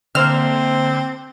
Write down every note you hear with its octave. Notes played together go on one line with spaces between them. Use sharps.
D3 A#3 C4 C5 E5 F6